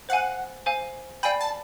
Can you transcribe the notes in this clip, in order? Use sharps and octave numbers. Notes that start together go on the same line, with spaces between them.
C5 F5 F#5 G#5
C5 F5 G#5
D5 F5 G5 G#5 B5
A5